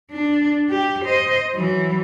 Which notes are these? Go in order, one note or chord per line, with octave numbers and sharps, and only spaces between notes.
D4
G4
C5 D#5
E3 F#3